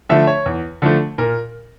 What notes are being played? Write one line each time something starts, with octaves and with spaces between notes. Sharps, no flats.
D3 F3 A3 E5
C#5
E2
D3 F3 A3
A#2 A#4